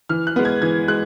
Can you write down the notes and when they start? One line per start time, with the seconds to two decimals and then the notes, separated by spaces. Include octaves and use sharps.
0.09 E3 F6
0.27 F#6
0.36 G#3 B3
0.45 G#6
0.62 E3 G#6
0.88 G#3 F#6